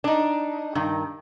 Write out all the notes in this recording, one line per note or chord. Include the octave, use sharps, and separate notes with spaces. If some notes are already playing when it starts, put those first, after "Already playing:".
D4 D#4
G2 D#3